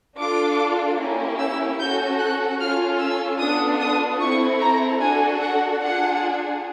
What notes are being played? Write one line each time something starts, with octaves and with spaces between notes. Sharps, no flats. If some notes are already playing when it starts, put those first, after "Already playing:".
D4 F4 A4 D6
A#3 C#4 E4 G4
E6
C#4 F#4 A4 G6
F#6
C#4 F4 A4 F6
E6
B3 D4 F4 A4 D#6
D#6
C4 E4 A4 C#6
A#5
D4 F#4 A4 G#5
F#5
D4 F4 G#4 F#5